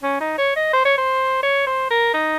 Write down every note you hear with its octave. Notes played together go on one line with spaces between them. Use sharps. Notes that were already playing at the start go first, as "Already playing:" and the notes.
C#4
D#4
C#5
D#5
C5
C#5
C5
C#5
C5
A#4
D#4